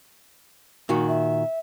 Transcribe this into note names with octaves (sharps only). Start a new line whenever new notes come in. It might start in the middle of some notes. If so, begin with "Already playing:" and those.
A#2 D#3 F#4
E5